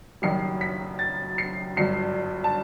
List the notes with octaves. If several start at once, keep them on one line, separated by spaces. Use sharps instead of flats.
F#1 F#2 D#3 G3 C7
B6
A6
C7
G1 G2 F#3 C7
A5